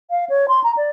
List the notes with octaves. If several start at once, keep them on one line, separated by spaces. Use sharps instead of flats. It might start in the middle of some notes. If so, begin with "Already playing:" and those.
F5
C#5
C6
A#5
D5